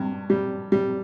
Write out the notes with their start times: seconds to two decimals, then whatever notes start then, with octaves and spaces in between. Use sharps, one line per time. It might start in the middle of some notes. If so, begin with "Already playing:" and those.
Already playing: G2
0.30 G3
0.72 G3